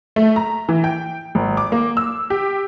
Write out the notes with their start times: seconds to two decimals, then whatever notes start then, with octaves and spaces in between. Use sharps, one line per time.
0.16 A3
0.36 A#5
0.69 E3
0.84 G5
1.35 G#1
1.57 D6
1.72 A#3
1.97 E6
2.30 G4